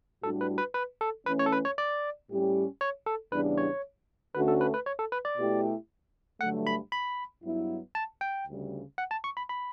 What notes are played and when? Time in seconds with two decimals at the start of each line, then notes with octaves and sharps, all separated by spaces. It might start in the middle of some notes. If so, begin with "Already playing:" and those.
0.23 A2 G3 D4 F#4 A4
0.41 B4
0.58 B4
0.74 B4
1.01 A4
1.26 E3 A3 C#4 B4
1.39 C#5
1.46 A4
1.52 B4
1.65 C#5
1.78 D5
2.30 A2 G3 C#4 G4
2.81 C#5
3.06 A4
3.32 E2 C#3 G3 D4 B4
3.58 C#5
4.34 D2 D3 A3 C#4 F#4 B4
4.48 A4
4.61 B4
4.74 B4
4.86 C#5
4.99 A4
5.12 B4
5.25 D5
5.37 B2 A3 E4 G4
6.41 G2 D3 F#3 A3 F#5
6.67 B5
6.92 B5
7.44 G2 F#3 B3 E4
7.95 A5
8.21 G5
8.47 D2 C#3 G3
8.98 F#5
9.11 A5
9.24 C#6
9.37 B5
9.49 B5